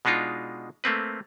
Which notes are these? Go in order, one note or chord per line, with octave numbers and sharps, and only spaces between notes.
B2 G#3 D4 D#4 F4
A3 A#3 C4 B4